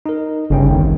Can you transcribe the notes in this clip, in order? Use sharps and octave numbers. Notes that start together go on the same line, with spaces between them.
D#4 A#4
G1 C#3 C#4 G5
C2 F2 D#3